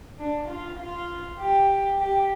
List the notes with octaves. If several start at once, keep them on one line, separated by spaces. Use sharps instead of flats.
D4
F4
F4
G4
G4